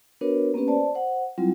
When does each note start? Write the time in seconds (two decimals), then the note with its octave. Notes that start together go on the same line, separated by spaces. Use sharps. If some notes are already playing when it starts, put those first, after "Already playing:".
0.21 B3 D4 F#4 A#4 B4 C#5
0.54 A#3 B3 C#4 G4 B4
0.68 C5 D5 A5
0.95 C5 F#5
1.38 F#3 G3 C4 E4 F4